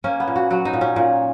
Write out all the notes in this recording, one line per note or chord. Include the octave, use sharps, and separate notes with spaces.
A#3 C#4
B3
A#2
F#4
F#3 F#4
D#4
A#2
C#4
A#2